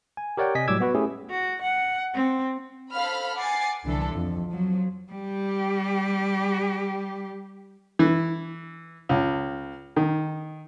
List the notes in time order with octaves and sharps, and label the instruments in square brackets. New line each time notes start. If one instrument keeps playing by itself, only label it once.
[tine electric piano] G#5
G4 A#4 C#5 D5 F#5 G5
C3 D#5 G#5 B6
A2 F#3 G3 D6 E6 G#6
B3 F#4 B4
A3 C#4 E4 G4 G#4
[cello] F#4
F#5
C4
[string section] A4 C5 F5 B5 F6
F#5 G#5 D6 A6 C7
C2 D3 E3 D4 A4
F2
F3 F#3
[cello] G3 G4
[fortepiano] E3
C#2
D#3